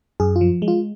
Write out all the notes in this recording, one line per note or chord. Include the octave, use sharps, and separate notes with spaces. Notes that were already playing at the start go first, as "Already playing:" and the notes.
F#2 G#4
F4
F3
G#3
F4